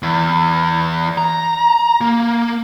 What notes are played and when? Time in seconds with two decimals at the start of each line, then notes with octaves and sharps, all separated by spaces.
0.03 E2
1.18 A#5
2.01 A#3